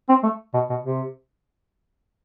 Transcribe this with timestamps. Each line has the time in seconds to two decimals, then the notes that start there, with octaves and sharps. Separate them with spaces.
0.09 C4
0.23 A3
0.54 B2
0.70 B2
0.84 C3